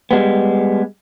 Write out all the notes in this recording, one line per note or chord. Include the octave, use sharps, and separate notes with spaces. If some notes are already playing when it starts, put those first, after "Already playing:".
G3 G#3 B3